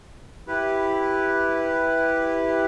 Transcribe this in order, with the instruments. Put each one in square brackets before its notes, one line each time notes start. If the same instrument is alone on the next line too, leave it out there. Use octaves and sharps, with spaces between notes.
[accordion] E4 G4 B4